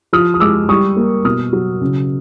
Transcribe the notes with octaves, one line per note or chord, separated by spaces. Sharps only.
F3 D#6 F6
D#6
G#3 D6 E6
G3 C#6 D#6
A#3
B2 D#6 F6
F#3
C#3